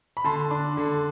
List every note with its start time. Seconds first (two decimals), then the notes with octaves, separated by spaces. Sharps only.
0.17 B5
0.24 D3 A5 C6
0.51 D4
0.77 D3